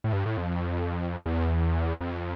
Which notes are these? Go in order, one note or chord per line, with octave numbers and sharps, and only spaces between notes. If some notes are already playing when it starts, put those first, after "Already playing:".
A2
G2
A2
F2
E2
F2